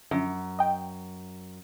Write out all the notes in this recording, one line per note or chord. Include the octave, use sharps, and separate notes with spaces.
F#2 D3 F3
D#5 G5